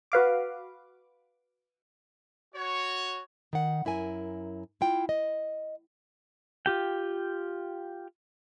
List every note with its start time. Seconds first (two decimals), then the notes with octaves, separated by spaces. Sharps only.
0.12 F#4 B4 F5 D6
2.55 F#4 C#5
3.53 D#3 F#5
3.85 F#2 E4 A#4 G#5
4.81 E4 F4 G5
5.09 D#5
6.66 F4 G4 G5